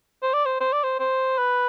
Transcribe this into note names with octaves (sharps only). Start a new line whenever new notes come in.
C5
D5
C5
C5
D5
C5
C5
B4